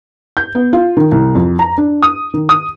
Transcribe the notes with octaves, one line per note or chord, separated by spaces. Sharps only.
G6
B3
F4
D#3
C2
F2
A#5
D4
D#6
D#3
D#6